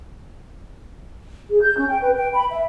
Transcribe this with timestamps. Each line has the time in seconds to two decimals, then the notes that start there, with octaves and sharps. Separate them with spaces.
1.50 G#4
1.62 G6
1.77 C#4
1.89 G5
2.02 B4
2.16 G5
2.34 B5
2.51 E5